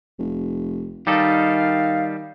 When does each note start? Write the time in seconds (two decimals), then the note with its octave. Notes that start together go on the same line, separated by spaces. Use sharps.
0.19 F1
1.07 D#3 G3 D#4 A4 F5